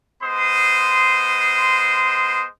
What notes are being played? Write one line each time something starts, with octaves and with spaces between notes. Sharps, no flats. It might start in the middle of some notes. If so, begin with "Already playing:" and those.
G#3 B3 C5 C6 D#6